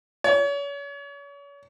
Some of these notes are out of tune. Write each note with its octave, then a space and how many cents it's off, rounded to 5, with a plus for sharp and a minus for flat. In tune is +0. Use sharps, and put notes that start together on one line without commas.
C#5 +35